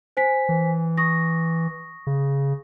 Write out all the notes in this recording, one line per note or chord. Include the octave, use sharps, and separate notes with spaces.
C5 G#5 B6
E3
C#6 D#6 A#6
C#3